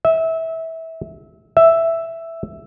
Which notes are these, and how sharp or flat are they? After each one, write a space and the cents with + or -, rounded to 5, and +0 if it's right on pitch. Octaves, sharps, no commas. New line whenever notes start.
E5 -20
E5 +5